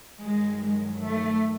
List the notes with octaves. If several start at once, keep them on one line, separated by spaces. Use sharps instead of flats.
G2 D#3 F#3 G#3
G#3
A3